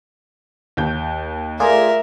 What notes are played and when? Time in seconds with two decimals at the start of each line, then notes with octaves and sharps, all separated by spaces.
0.77 D#2 G6
1.60 A3 F4 G#4 A#4 D5 E5